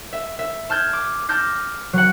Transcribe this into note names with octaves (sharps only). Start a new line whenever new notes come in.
E5
E5
A5 F6 G6 G#6
D6
A5 D6 F6 G6 A#6
F#3 F#5